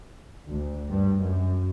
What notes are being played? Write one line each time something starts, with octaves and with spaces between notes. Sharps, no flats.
D2
G2
F#2